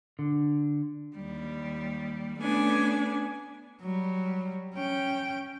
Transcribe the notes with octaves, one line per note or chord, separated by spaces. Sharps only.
D3
D#2 G3
A3 B3 C#4 D4 B4 G#5
F#3 G3
C#4 G5